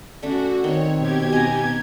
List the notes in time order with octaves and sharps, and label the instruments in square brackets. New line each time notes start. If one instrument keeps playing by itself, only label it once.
[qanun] D3 A3 D4 [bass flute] C#4 [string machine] F#4
[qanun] D#3 [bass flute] C4 [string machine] C#5
[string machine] B2 G4 G#6
[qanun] D#5 A#5 [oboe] G#5